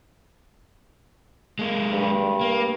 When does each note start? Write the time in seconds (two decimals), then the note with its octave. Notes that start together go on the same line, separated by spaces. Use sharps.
1.59 G#3 A#3
1.92 G2
2.41 A#3